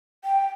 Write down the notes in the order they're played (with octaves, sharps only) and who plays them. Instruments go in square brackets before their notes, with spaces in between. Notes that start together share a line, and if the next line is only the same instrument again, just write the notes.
[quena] G5